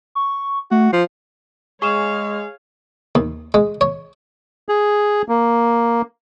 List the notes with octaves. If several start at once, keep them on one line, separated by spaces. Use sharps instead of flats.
C#6
A3 F#4
F3 C7
G#3 G#4 C#5 F5 C#6 E7
D#2
G#3
C#5
G#4
A#3